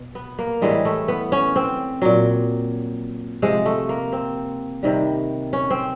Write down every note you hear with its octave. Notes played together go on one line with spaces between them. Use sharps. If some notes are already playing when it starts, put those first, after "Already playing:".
Already playing: B2
B3
A#3
A2 E3 G3 G#3
A3
B3
C#4
C4
A#2 F#3
C3 F3 G#3
A3
A#3
C4
C3 D#3 G3
C#4
C4